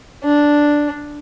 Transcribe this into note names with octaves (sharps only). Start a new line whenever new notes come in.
D4